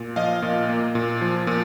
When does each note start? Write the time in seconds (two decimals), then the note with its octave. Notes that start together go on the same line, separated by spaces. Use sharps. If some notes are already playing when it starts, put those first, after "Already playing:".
Already playing: A#2
0.16 F3 D#5 F5
0.42 A#2
0.69 A#3
0.95 A#2
1.21 F3
1.47 A#2